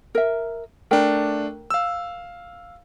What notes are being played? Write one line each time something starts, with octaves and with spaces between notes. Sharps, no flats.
A#4 E5
A3 D4 A#4 G5
F5 E6